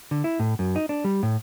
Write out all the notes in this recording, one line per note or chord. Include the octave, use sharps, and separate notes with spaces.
D3
E4
A2
F#2
D#4
D4
G3
A2